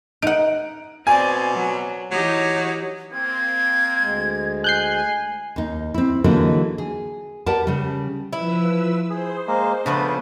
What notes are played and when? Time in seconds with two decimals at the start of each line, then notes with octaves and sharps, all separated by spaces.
0.22 D#4 F#5 D7
1.07 B2 C4 D5 G#5
1.52 F#3
2.11 E3 F#3 D#4 G4
3.12 A#3 C4 G#6
4.00 D2 G#3
4.64 G#5 F#6 G6 C7
5.56 D#2 D#4
5.94 C4 E4
6.24 D3 E3 F#3 G#3 A#3 D#4
6.78 G#4
7.46 G4 A#4 B4 D5 F#5 A5
7.67 C#3 G3
8.33 F3 E4 B4 E6
9.10 G#4 C5
9.47 G#3 A#3
9.86 C#3 F3 A3 B3 D4 B4